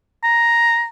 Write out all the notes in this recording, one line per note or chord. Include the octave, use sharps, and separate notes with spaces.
A#5